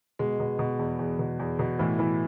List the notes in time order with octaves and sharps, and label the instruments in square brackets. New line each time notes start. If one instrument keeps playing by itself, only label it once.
[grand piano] B2 G#3
B2
B2
E2
E2
B2
E2
B2
A2 E3
E3